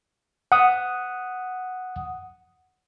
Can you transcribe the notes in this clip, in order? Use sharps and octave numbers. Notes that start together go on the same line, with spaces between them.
F#5 D#6